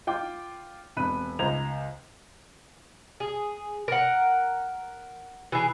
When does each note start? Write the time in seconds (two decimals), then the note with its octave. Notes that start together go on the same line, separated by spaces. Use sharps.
0.07 F4 G5 D6
0.97 E1 C3 B5 F#6 D#7
1.39 C#2 C5 A#5 G#6 F7
3.20 G#4
3.88 A#4 F#5
5.52 E3 G#4